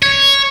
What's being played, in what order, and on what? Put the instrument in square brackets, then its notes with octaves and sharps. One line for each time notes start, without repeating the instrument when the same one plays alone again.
[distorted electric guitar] C#5